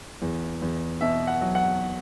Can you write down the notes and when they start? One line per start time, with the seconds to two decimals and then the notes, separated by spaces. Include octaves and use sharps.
0.22 E2
0.62 E2
1.01 B2 E5
1.27 F#5
1.41 F#3
1.55 F#5